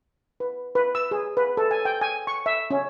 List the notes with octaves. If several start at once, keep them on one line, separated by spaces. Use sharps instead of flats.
B4
B4
E6
G#4
B4
A4
G#5
G5
G#5
C#6
E5
C#4